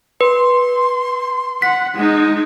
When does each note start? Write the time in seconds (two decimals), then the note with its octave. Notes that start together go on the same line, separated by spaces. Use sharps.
0.21 B4 C6
1.62 F#5 B6
1.95 G#3 D#4